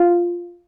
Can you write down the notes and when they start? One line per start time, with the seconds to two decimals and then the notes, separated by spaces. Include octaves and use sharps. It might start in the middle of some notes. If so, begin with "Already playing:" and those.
Already playing: F4